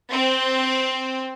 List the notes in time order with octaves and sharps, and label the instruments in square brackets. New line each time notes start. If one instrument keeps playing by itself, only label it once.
[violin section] C4